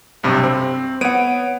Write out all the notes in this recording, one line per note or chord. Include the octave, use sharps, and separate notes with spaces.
B1 G2 C3
C4
B3 C#5 F#5 D7 D#7